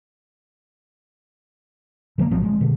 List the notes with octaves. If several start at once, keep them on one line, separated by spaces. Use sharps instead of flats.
D3 F3 G3 A#3
A1 F3 F#3 C4
G#3
B2 D3